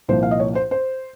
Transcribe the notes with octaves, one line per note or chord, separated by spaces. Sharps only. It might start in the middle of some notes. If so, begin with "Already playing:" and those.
C2 A#2 F3 C5
F5
D#5
C#5
C5
C5